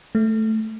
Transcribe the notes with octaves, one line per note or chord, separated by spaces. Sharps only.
A3